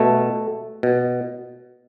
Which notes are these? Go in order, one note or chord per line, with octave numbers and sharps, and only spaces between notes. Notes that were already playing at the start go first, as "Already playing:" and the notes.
Already playing: B2 A3
B2